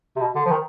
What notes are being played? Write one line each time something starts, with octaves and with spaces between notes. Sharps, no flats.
C3
B2
D3
F3
D#3